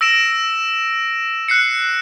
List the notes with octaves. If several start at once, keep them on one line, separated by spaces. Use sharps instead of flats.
E6 A#6 D7 E7
F#6 C7 C#7